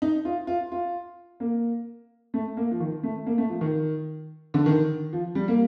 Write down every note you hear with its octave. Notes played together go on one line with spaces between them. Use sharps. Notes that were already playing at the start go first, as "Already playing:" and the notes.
D#4
F4
F4
F4
A#3
A3
A#3
F3
D#3
A3
A#3
A3
F3
D#3
D3
D#3
F3
G3
A#3